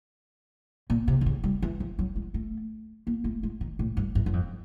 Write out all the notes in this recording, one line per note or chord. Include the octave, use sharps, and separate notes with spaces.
A#2
C3
D3
C#3
G3
E3
F3
F#3
G#3
A3
A#3
A3
G#3
D#3
A2
G2
F#2
F#2
F2